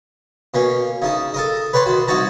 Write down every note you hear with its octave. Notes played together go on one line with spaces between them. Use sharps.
B2 A#3 C#4
C#3 D#4 A5
A4 A#4 D#5
B4 C#5 G5 A5 C6
D#3 F#4
C2 D#4 F#4 C#5 A5 A#5